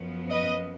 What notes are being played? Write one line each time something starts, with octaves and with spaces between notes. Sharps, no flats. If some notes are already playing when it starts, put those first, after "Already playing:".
Already playing: F#2 F3 B3
B4 D#5